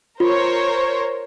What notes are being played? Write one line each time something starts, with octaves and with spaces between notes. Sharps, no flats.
F4 A#4 C5 C#5